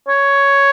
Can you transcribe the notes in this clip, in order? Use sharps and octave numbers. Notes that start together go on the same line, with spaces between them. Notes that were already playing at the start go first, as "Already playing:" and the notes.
C#5